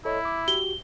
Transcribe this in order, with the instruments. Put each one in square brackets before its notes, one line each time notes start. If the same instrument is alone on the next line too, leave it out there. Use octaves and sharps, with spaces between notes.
[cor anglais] E4 [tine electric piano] A4 C#5 D#5
[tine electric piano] D6
[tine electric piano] F#4 G4 [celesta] G7